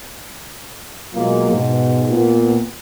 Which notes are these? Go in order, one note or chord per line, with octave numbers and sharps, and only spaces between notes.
B2 F#3 G#3 A#3 F4
G#2 B2
A#2 B3